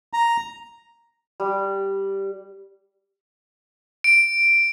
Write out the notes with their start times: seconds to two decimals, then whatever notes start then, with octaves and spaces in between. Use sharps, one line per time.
0.13 A#5
1.40 G3
4.04 D7